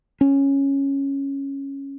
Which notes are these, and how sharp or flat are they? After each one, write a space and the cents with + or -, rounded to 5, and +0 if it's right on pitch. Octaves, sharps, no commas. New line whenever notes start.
C#4 -5